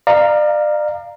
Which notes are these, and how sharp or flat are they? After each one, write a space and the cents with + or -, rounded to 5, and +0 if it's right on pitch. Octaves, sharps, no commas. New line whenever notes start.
D5 +35 F5 -5 A#5 +0